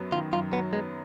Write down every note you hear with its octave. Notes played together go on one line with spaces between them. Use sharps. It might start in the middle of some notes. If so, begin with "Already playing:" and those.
Already playing: F#2 F#3 B3
D#3 F4
F#2 F4
F#3 B3
G#3 B3